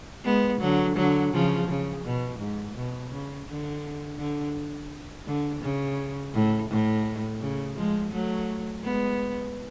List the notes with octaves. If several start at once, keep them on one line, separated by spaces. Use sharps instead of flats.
G#3 B3
D3 F#3
D3 F#3
C#3 F3
C#3
B2
G#2
B2
C#3
D3
D3
D3
C#3
A2
A2
C#3
F3 G#3
F#3 A3
G#3 B3